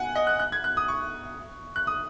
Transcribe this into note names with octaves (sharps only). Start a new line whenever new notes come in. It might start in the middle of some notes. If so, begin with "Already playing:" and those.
Already playing: F#5 G#5
D#5
F#6
F#6
G#6
F#6
D#6
C#6
F#6
D#6